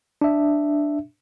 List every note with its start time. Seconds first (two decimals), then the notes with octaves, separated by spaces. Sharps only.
0.21 D4 E5